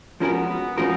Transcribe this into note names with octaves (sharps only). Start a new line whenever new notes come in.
F3 G#3 B3 C#4 F#4 A#4
B3
F3 G#3 C#4 D#4 F#4 A#4